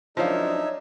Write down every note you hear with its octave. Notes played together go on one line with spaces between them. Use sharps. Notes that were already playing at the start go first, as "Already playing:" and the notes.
F#2 F3 G#3 D4 D#4 C#5 E5 F5